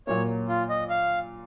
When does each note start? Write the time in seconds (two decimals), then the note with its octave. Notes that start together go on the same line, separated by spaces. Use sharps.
0.07 A#2 F#3 A#3 C#5
0.49 F4
0.70 D#5
0.90 F5